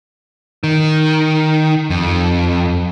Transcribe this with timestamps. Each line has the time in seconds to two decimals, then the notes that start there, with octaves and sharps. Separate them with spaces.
0.64 D#3
1.90 F2